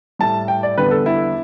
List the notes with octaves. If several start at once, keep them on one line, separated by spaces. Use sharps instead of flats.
A2 G3 A5
G5
D5
E2 D3 G3 B4
A4
E4